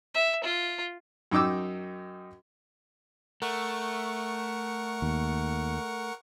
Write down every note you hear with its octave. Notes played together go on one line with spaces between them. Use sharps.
E5
F4
F#2 D#4 G5 D6 E6
A3 A#4 F#5 C#6
D#2